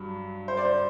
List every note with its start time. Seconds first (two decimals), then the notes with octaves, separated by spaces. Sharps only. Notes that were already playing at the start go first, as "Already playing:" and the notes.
Already playing: G2 F#3
0.48 C5
0.57 D5
0.65 C5